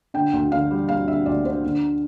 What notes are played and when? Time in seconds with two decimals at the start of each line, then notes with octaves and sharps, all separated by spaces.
0.14 D3 G5
0.33 D2
0.52 D3 F5
0.71 G3
0.89 G3 F5
1.08 D3 E5
1.26 D2 D5
1.45 D3 C5
1.64 D3